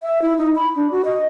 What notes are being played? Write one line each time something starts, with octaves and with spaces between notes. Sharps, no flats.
E5
E4
D#4
B5
D4
F#4
D#5